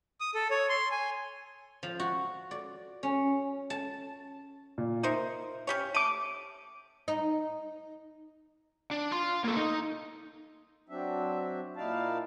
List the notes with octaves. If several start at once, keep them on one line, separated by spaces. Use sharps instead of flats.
D#6
A4
C#5
C6
G#5
F3
F#4
D5
C#4
A5
A#2
D#4 A#4 C5 E5
C#4 G4 C#5
A3 D6 D#7
D#4
D4
F5 C6
A#3 A4
D#4
F#3 C4 D4 E5
A#2 D#4 E4 D5 F5 A5